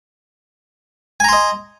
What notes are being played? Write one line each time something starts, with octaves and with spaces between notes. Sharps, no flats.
D#5 G#5 A#5 C6